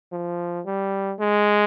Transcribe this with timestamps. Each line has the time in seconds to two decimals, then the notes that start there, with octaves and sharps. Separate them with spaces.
0.12 F3
0.66 G3
1.20 G#3